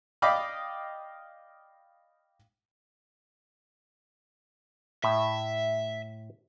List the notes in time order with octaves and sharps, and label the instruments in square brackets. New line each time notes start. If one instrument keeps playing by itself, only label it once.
[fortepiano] D5 D#5 F5 G5 B5 D6
[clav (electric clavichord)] A2 [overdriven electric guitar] E5